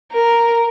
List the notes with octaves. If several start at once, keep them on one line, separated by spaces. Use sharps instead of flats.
A#4